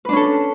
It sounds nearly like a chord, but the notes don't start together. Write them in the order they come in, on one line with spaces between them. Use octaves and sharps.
B4 D4 C#4 A4